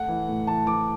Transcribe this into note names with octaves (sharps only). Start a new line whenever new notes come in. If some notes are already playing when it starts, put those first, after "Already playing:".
Already playing: A3 F#5
E3
A2
E3 A5
E3 D6